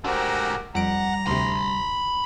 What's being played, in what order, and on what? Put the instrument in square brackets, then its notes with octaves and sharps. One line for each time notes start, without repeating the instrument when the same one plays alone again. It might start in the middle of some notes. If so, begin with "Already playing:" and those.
[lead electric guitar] G#2 A3 [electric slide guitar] D4 C5 [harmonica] F#4 G4 A#4
[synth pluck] F2 D7 [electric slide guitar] G3 [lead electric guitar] F#5 [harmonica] A#5
[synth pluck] D2 C3 [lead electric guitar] B5 C6